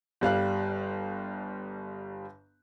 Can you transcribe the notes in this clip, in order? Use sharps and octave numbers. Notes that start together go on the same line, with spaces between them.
G1 G3 F5 F#6